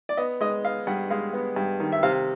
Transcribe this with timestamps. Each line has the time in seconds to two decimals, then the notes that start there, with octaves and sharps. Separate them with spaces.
0.09 D5
0.17 B3 D#5
0.41 G#3 D#5
0.64 B3 F5
0.87 G2 F#5
1.10 G#3 F5
1.33 B3
1.56 G2
1.80 D#3
1.92 E5
2.03 C3 F5